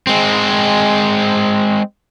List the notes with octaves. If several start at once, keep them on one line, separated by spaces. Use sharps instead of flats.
G#3 C4